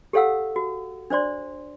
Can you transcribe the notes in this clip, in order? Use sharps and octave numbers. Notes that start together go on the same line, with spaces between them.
G4 A4 C#5 F5 F#5 E6
F#4
D4 C5 D5 C6